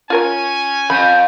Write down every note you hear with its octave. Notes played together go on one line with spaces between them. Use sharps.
C#4 F4 A#4 C#5 G#5
F2 B5 G6